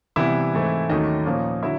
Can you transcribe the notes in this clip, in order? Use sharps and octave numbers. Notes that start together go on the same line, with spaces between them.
C3 E3 G3 B3 E4 E5
G#2 E3 A3 C4
D#2 D#3 F#3 A3 C#4 D#4 D#5
A#2 F3 A#3 C#4
D3 F#3 E4 E5